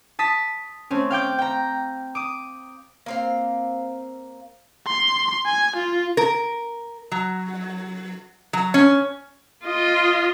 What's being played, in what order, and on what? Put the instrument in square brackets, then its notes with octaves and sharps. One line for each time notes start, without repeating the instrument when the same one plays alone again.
[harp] A5 D#6 B6
A3 C4 C#4
F5 G5 D6 G6
G5 A#5
D6 D#6
[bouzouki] A#3 C4 F5
[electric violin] C6
G#5
F4
[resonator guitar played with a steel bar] A#4
F#3
F#3
C#4
[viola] F4 D#5